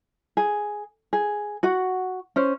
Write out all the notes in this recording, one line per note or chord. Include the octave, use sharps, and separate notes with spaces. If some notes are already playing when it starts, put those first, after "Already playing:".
G#4
G#4
F#4 F#5
C#4 C5